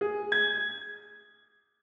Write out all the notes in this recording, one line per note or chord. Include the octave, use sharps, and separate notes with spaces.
G#4
G#6